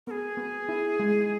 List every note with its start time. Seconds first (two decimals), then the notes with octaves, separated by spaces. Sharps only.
0.07 B3 G#4 A#4
0.37 B3
0.69 E4
1.00 G#3